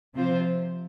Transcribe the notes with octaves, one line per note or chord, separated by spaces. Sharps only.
C3 F3 C4 F4 C5